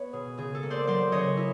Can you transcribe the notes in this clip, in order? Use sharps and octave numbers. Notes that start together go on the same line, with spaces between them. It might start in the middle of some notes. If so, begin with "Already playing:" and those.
Already playing: B3 B4 C#5
B2 G#4
C#3 G#4
A4
A#3
C5 D5
F#3 C5 D5
C#3 C#5 D#5
E4